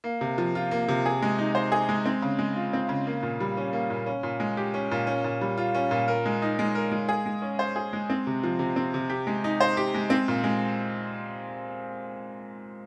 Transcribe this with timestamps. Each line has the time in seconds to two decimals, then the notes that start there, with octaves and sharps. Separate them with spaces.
0.04 A#3
0.21 C3
0.38 F3
0.55 F4
0.71 A#3
0.88 C3
1.06 G#4
1.22 G#3
1.38 D#4
1.55 C5
1.72 G#4
1.89 G#3
2.06 C4
2.22 C#3
2.39 G#3
2.56 F4
2.73 C4
2.89 C#3
3.07 A#3
3.22 A#2
3.40 G3
3.57 C#4
3.73 A#3
3.90 A#2
4.06 C#4
4.23 A#2
4.40 G#3
4.57 G4
4.74 C#4
4.91 A#2
5.07 C#4
5.24 A#2
5.41 G3
5.58 F4
5.75 C#4
5.91 A#2
6.08 A#4
6.25 G#3
6.42 D#4
6.59 G#3
6.75 A#4
6.91 G#3
7.09 G#4
7.26 G#3
7.42 C#4
7.59 C5
7.76 G#4
7.93 G#3
8.10 C4
8.27 C3
8.43 F3
8.59 C3
8.76 C4
8.94 C3
9.10 G4
9.27 G#3
9.44 D#4
9.60 C5
9.77 G4
9.94 G#3
10.10 C4
10.28 A#2
10.44 G#3